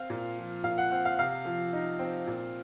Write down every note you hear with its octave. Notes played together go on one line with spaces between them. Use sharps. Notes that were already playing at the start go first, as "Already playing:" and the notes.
Already playing: C4 F5
A#2
F3
A#2 F5
F#5
C4 F#5
F5
C3 F5
F3
D#4
C4
A#2